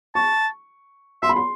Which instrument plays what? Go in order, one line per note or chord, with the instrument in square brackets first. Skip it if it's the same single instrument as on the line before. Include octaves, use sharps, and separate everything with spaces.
[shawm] A5 [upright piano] C#6
[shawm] E5 [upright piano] C6
[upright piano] B5
C6